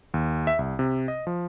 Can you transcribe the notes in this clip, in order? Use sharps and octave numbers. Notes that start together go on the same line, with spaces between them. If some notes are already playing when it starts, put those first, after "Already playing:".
D#2
E5
C2
C3
D#5
F3